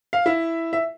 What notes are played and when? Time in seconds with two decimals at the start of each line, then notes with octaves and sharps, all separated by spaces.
0.13 F5
0.26 E4 E5
0.73 E5